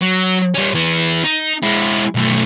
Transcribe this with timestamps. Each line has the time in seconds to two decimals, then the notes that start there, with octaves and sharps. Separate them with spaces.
0.02 F#3
0.54 G3 C#4
0.74 E3 B3
1.24 D#4
1.62 G#3 E4
2.15 B1 A3